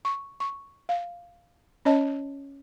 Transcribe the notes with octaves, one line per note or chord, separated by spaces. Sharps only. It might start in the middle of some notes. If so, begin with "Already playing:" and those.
C#6
C#6
F5
C#4 C#5 D#5 A5